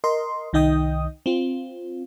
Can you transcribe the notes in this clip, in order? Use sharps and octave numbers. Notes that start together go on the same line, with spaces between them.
A#4 D#5 C6
C2 D#3 D#4 D#5 G5 D#6
C4 F4